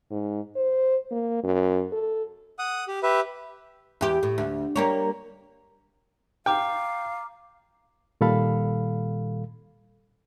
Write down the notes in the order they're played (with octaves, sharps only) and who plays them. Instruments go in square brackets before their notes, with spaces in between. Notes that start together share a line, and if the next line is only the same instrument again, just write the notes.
[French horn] G#2
C5
A#3
F#2
A4
[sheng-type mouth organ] F#5 D#6
G4
G4 B4 E5
[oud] E2 G4
A2
D2
G3 A#3 C#5
[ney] F5 [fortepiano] G5 [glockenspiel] A#5 D6 F6
[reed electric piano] A#2 D#3 G3 A4 F5 B5